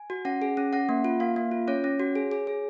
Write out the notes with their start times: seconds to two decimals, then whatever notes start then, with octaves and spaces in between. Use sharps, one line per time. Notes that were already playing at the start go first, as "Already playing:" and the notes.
Already playing: G#5
0.10 F#4
0.25 C#4 F#5
0.42 G#4
0.57 C#4
0.73 C#4 F#5
0.89 A#3
1.05 F4
1.20 A#3 F5
1.36 A#3
1.52 F4
1.68 C#4 C#5
1.84 C#4
2.00 F#4
2.16 G#4
2.31 G#4
2.47 G#4